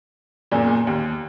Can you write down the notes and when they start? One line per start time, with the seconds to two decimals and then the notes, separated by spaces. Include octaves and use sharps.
0.51 F#1 E2 A#2
0.87 D#2